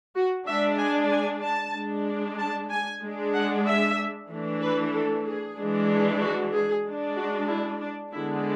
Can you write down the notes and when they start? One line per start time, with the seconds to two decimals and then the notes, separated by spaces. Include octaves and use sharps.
0.15 F#4
0.47 G#3 D4 E5
0.78 G#5
1.10 G#5
1.43 A5
1.74 G#3 D4
2.38 A5
2.70 G#5
3.02 G#3 D4
3.34 F#5
3.66 E5
4.29 E3 A3 D4
4.61 B4
4.93 A4
5.25 G#4
5.58 E3 G#3 D4
6.21 F#4
6.53 G#4
6.85 G#3 D4
7.17 F#4
7.48 E4
7.80 D4
8.13 D3 G#3 B3 D4 E4